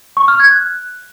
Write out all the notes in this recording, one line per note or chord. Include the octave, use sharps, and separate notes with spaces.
C#6
F6
G#6
F#6